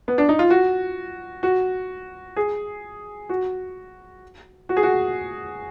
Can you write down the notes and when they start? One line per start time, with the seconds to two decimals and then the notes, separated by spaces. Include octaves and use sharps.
0.08 B3
0.18 D4
0.29 D#4
0.39 F4
0.50 F#4
1.43 F#4
2.36 G#4
3.29 F#4
4.69 F#4
4.77 G#4
4.83 F#4